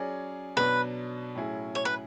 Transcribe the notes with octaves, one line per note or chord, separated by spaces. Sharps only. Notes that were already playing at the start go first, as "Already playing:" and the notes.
Already playing: F#3 C#4 G#4 D5
B2 F#3 B3 D4 B4
A2 F#3 C#4 E4 G#4
C#5
B4